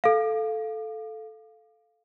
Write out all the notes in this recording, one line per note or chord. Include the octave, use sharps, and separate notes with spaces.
A4 F5